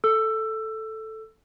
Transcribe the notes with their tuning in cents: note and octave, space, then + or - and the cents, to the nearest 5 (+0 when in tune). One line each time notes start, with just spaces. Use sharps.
A4 +0 E6 +20